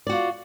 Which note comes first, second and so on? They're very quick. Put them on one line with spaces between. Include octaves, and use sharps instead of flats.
D5 F#4 F4